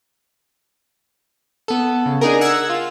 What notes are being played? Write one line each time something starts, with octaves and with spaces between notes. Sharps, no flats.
B3 A4
C#3
D4 D#4 G#4 A#4
F#5 E6 F#6 G#6
F4